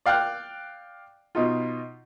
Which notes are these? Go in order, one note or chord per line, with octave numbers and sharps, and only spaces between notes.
D5 F5 G5 F6 F#6
B2 D#4 F4